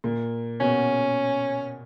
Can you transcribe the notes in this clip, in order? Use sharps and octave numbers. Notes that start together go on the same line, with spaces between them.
A#2 A#3
B2 B3 C#4